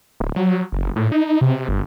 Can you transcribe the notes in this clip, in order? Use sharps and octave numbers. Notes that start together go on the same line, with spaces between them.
D1
F#3
F#1
A2
D#4
C3
G1